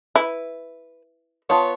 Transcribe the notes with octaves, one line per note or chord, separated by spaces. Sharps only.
E4 B4
B3 F4 C#5 A5 C6 D#6